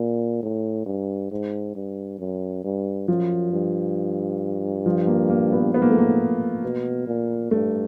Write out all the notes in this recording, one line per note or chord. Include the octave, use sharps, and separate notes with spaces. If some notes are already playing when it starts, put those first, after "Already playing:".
Already playing: A#2
A2
G2
G#2
G2
F#2
G2
F#2 F3
G2
F3
A#3
A#3
B3
G#2 B3
A#3
A3
A#3
B2
A#2
G2 A3